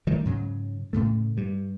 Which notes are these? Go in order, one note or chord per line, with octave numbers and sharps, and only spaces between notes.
D#3 F#3 G3 A3
G#2 C#3 F#3
A2 C#3 A3
G2 G3